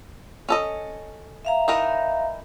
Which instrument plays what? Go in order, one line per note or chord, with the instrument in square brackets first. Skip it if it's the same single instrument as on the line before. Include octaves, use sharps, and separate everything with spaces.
[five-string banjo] C#4 A4 D#5
[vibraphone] E5 F5 A#5
[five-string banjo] E3 D#4 A#4